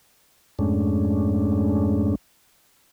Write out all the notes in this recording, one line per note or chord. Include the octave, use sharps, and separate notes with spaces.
F2 G#2 G#3 A3 C#4 D4